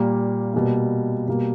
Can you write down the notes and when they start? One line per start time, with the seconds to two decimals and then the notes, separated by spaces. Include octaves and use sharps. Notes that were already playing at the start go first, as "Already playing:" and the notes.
Already playing: A#2 G3 A#3
0.54 B2 G3 A#3
1.28 B2 G3 A#3